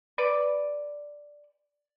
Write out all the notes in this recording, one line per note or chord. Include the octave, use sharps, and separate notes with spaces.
B4 D5